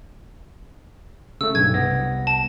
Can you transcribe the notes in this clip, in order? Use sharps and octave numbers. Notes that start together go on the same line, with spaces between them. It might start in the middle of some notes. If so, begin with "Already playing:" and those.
C#3 A3 E6
B1 G2 G#6
C2 B3 A#6
A5